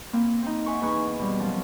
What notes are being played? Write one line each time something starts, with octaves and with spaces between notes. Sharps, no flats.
A#3 C4 E4
C4 D#4
E5 F#5 G#5 C6 C#6
E2 B3 D#4 B4 C#6
B2 G3
F#2 F3 F#3